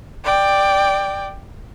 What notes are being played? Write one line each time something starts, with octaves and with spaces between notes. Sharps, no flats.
D5 G5